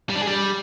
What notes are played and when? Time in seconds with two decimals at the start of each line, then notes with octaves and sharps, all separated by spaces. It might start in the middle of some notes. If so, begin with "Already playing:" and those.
0.10 G3
0.15 D4
0.21 G#4
0.27 G3